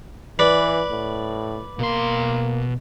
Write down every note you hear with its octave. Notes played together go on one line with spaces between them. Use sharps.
E3 B4 D5
A2
B2 A#3 C6